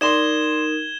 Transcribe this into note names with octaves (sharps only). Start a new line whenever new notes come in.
D#4 A#4 D5 C6 G#6 E7 G7